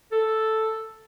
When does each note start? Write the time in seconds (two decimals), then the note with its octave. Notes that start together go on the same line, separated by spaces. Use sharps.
0.12 A4